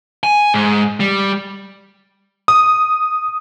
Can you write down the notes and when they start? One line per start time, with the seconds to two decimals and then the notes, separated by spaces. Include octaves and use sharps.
0.23 G#5
0.54 G#2
1.00 G3
2.48 D#6